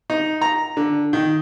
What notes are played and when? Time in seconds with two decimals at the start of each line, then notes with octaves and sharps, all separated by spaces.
0.10 D#4
0.42 A#5
0.77 D3
1.13 D#3